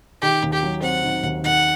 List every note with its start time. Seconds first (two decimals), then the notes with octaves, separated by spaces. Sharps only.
0.21 D#3 G4
0.43 D#2
0.53 G4
0.63 F#3
0.82 C4 F#5
1.03 D#3
1.23 D#2
1.43 D#3 F#5